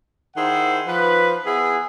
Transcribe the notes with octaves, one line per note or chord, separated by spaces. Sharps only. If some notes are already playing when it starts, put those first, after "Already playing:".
D#3 E4 G#4 C5 F#5
F3 B4
B3 E4 G#4